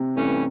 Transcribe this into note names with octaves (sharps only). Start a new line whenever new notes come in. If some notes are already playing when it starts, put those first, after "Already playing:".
Already playing: C3
G2 E3 A3 C#4